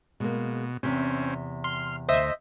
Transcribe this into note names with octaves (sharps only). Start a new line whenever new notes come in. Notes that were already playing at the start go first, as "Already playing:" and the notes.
B2 G#3 A#3
E2 C3 C4 C#4
C6 F6
D2 C5 D#5 E5